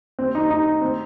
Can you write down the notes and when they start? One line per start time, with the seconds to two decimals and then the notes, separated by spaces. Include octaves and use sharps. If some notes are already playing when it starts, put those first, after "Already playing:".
0.19 C4
0.35 D#4
0.50 D#4
0.81 C4